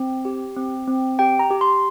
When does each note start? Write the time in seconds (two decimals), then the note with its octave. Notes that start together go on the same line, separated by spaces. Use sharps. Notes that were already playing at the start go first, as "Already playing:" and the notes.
Already playing: C4
0.25 G4
0.57 C4
0.87 C4
1.19 G4 G5
1.39 A#5
1.51 G4
1.61 C6